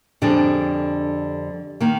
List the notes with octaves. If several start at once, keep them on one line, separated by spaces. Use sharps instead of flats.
F2 D3 G3 D4 G#4
D#3 A#3